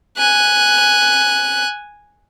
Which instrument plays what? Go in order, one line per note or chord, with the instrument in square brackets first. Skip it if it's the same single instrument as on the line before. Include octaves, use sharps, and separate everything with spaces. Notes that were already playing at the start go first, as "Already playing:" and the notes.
[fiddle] G#5 F#6